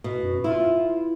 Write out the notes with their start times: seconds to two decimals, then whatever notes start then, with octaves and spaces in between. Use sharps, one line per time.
0.04 B2
0.23 F#2
0.44 E4 F4